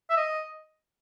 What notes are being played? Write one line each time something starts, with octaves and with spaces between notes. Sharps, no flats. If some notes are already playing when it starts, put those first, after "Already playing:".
E5
D#5